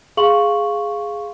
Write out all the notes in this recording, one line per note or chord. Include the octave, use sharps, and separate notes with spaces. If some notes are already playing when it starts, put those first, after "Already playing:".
G#4 F5 C6 C#6 F#7